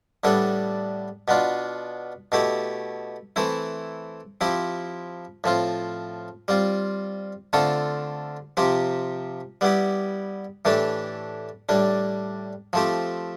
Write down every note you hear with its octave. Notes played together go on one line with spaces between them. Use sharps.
A2 G3 B3 D4 A4
B2 B3 D4 F4
B2 A3 E4 G4
E3 A3 C4 E4
F3 C4 E4 G4
A2 F3 C4 F4
G3 C4 F4
D3 A3 C4 F4 A4
C3 F3 C4 G4
G3 B3 E4 G4
A2 E3 A3 D4 G4
A2 G3 D4
F3 A3 C4 G4